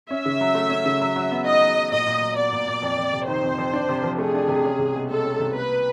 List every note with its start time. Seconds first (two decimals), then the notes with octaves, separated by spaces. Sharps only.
0.10 C#4 E5
0.26 C#3
0.41 F#3
0.55 A3
0.70 C#4
0.86 C#3
1.01 F#3
1.16 F#3
1.31 B3
1.46 D#4 D#5
1.61 F#3
1.76 F#3
1.91 A#2 D#5
2.07 A#2
2.21 F#3
2.37 B3 D5
2.52 A#2
2.67 A#2
2.82 F2
2.98 F2
3.13 C3
3.27 D#3 C5
3.43 F2
3.58 F2
3.73 D4
3.89 C3
4.03 F3
4.18 A3 G#4
4.34 D4
4.48 C3
4.64 C#4
4.79 C2
4.95 B2
5.10 G#3 A4
5.24 C#4
5.39 C2
5.55 A#3 B4